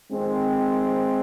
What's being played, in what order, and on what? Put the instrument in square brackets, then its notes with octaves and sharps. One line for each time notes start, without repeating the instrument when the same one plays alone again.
[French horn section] F2 D#3 G#3 C4